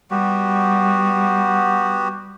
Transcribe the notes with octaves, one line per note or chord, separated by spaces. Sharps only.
G3 B3 F#4 G4